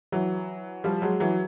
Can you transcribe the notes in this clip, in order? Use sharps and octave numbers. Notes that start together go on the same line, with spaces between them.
E3 F#3
F3 G3
F#3 G#3
E3 F#3